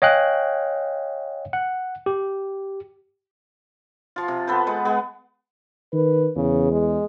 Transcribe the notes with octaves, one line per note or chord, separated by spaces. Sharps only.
C#5 D#5 F5 G5 G#5 F#6
F#5
G4
F3 F4
C3
B3 A4 B4 C5
G#3 B4 F#5
G#3 B3 G#4
D#3 B4
E2 C#3
G#3